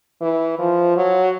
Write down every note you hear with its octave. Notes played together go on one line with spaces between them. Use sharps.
E3
F3
F#3